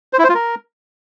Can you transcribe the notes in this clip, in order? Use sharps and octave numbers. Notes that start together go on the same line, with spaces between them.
C5
E4
C5
F4
A#4